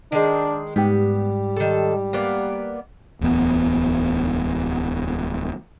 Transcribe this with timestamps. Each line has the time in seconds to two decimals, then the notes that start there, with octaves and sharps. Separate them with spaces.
0.12 D#3 G#3 D4
0.76 G#2 G3 B3 G4
1.56 D#3 A4
2.13 A#3 B3 D5
3.21 D1 E2 B3